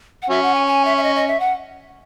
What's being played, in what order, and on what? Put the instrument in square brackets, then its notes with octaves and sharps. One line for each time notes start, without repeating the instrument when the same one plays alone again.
[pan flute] F#5
[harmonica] F#3 C#4 [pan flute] E5
[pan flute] F#5
G#5
G#5
E5
E5
D#5
D#5
E5
F#5